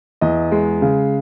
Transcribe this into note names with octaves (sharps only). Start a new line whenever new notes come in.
E2 D#5
G#3
C#3